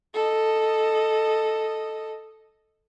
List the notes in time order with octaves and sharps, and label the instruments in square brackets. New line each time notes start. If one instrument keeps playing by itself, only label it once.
[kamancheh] A4 D#5